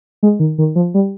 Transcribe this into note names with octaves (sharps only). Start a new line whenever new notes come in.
G#3
D#3
D#3
F3
G3